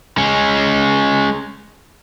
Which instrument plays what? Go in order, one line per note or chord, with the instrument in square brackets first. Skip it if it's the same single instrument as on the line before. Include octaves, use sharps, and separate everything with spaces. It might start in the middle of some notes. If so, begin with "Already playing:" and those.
[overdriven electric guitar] G#3 C#4